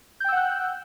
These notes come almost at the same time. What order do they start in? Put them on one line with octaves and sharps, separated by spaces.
G6 G5 E6 F#5 F#6